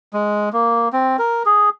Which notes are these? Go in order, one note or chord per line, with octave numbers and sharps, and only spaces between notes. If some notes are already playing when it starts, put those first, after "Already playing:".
G#3
A#3
C4
A#4
G#4